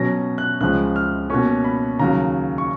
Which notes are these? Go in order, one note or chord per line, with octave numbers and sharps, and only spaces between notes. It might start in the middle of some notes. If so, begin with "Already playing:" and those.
Already playing: B2 F#3 C#4 A#6
F#6
C#2 C#3 F3 G#3 F#6
F6
B2 A#3 C#4 C#6
B5
D#2 C#3 F#3 A#5
C#6